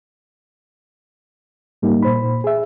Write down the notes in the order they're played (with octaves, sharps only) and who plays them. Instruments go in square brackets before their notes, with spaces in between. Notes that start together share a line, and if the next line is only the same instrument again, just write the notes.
[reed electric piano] G#2 G3 A#3 D#4
A#2 C5 B5
G#4 E5